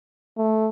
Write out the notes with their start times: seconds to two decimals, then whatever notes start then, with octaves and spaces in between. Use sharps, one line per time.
0.37 A3